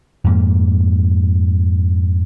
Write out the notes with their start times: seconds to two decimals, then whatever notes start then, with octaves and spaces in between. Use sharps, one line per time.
0.24 F2 G#2 A#3